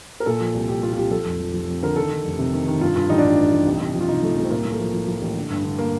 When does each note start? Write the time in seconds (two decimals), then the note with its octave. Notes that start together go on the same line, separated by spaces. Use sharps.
0.20 A#4
0.26 A#2 A4
0.40 F3
0.55 C2
0.68 C2 G4
0.83 A#2 F4
0.93 F4
0.97 C2 G4
1.11 F3 A4
1.26 F1
1.40 F3
1.54 F3
1.68 F2
1.83 D3 A#4
1.96 D#3 A4
2.10 D#3
2.25 F1
2.39 C3
2.53 D#3
2.67 D#3
2.81 G2 F4
2.96 G2 F4
3.09 A1 D#4
3.18 D4
3.23 G2 D#4
3.38 G2
3.52 A1
3.66 C2
3.81 C2
3.94 F3
4.01 F4
4.08 C3 D#4
4.23 F3 A3
4.37 C2 A3
4.44 C4
4.51 A2 A#3
4.65 A2
4.72 A3
4.79 F3
4.94 F3
5.07 F3
5.22 A1
5.36 D3
5.50 G2
5.64 D3
5.79 A#3